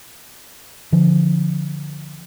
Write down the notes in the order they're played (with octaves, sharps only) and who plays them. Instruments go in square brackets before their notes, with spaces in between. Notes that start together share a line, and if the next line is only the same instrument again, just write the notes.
[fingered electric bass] D3 F3